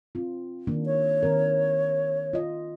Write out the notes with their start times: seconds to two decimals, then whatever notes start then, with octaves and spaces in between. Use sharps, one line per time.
0.15 C4 F4
0.67 D#3 A#3 D4
0.86 C#5
1.23 D#3 C4 A#4
2.33 F4 D#5